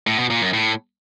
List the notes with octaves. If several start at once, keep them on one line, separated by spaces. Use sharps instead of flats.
A2
B2
A#2
F#2
A2